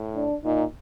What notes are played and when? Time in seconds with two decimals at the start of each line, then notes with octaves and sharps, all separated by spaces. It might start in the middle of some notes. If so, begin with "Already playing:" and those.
Already playing: A2
0.15 D4
0.44 A#2 D#4